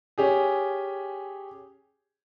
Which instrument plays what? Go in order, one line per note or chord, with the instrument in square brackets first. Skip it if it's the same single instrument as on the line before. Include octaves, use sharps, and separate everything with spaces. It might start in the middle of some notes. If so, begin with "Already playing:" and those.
[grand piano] C#4 G4 G#4